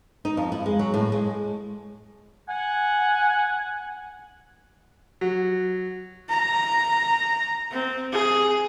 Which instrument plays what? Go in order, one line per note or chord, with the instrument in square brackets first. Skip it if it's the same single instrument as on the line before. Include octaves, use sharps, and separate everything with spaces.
[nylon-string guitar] D#4
F2
E4
G#3
F#3
A2
G#3
[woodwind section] F#5 G#5
[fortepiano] F#3
[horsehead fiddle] A#5
C4
G#4